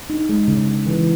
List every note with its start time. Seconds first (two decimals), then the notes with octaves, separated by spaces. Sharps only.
0.10 D#4
0.29 G#3
0.48 C#3
0.67 C#3
0.86 E3